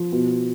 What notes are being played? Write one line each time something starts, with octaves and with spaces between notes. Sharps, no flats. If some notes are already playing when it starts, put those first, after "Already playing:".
Already playing: F3
B2